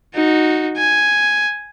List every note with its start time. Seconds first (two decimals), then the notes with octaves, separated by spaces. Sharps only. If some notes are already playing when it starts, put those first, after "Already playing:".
0.15 D#4 F#4
0.77 G#5